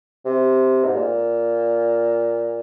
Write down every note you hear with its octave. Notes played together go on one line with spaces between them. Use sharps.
C3
G#2
A#2